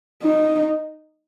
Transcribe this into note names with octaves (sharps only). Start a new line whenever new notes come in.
D#4